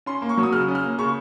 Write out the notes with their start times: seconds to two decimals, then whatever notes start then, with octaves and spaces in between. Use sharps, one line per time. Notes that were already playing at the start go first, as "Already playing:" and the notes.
0.06 C#4 C6
0.22 A#3
0.29 C#6
0.37 F#3
0.43 D#6
0.52 C#3 F6
0.68 C#4
0.75 F6
0.83 A#3
0.98 C#3 C#6